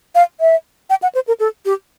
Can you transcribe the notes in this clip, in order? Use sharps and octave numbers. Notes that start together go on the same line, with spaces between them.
F5
E5
G5
F#5
C5
A#4
A4
G4